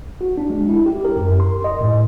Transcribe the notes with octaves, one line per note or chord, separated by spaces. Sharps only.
F#4
D4
G#3
E4
G4
A#4
F#2
C6
D#5
A2